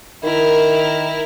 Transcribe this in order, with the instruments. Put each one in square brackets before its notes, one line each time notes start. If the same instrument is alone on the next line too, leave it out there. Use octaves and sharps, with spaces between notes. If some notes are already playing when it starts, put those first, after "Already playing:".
[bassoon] D#3 [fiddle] E4 A#4